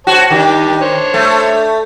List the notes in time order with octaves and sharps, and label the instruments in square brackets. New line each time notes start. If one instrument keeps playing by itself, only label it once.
[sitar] F#4 [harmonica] C5 C#5 A5
[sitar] D#3 [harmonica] D4 G4
[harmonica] D4 C5 C#5
[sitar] A3